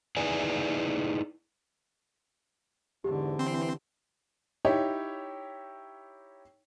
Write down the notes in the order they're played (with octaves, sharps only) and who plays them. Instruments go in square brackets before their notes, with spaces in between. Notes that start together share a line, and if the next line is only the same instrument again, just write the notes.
[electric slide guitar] D#4 E4 G#4 B4 D5 G#5
[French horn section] E2 G#2 [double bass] D3 [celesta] G4
[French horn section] E3 [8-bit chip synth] C4 C6
[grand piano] D#4 E4 G4 C#5